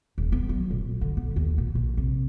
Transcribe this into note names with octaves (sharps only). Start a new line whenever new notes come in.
D#1
B3
F#3
A#2
D3
B3
D#2
A#2
A#1
C3